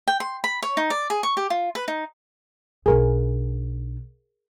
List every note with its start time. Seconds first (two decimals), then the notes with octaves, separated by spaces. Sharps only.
0.08 G5
0.20 C6
0.44 B5
0.62 C#5
0.77 D#4
0.90 D5
1.10 G#4
1.23 C#6
1.37 G4
1.50 F4
1.75 B4
1.88 D#4
2.86 B1 D4 G#4 A#4